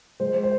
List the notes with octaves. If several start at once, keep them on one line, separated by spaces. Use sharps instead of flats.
G#3 C5
C5